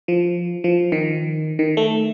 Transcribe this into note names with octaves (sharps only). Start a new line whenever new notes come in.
F3
F3
D#3
D#3
A3